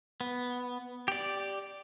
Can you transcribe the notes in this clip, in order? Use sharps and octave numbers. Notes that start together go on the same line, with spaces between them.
B3
G4 D5